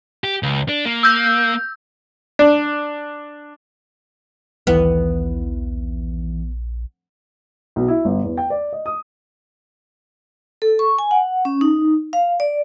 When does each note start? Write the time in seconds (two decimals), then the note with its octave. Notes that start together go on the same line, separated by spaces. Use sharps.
0.24 G4
0.43 C#2
0.69 D4
0.85 A#3
1.03 E6 G6
2.39 D4
4.67 A#1 D#2 E3 B3
7.76 B1
7.88 E4
8.05 G1
8.24 E2
8.37 G5
8.50 D5
8.73 D#5
8.86 D#6
10.62 A4
10.79 C#6
10.99 G#5
11.11 F#5
11.45 C#4
11.61 D#4
12.13 F5
12.40 D5